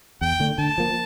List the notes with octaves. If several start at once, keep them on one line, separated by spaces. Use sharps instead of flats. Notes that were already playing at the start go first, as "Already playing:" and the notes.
E2 G5
D3 A3 D4
D3 A5
F3 A#3